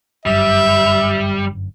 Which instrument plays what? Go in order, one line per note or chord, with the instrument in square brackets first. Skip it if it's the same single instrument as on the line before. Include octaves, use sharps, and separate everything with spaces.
[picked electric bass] G1 F#2 [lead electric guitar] G3 [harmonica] E5